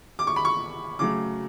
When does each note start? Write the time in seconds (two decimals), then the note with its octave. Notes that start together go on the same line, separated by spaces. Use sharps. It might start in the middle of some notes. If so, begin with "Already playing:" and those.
0.19 D6
0.27 C#6
0.36 B5
0.45 C#6
0.99 C#3 F#3 A3 D6